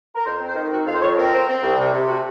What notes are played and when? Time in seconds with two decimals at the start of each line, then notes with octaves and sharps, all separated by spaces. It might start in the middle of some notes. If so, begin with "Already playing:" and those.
0.15 A#4
0.25 F2 C5
0.41 C4
0.48 C5
0.55 D#3
0.71 C4 F#4
0.86 F2 F5
0.94 C5
1.02 F2 C#5
1.17 C4 A#4
1.32 C4
1.47 C4
1.62 C2
1.78 C3
1.93 C3
2.08 A3 F#4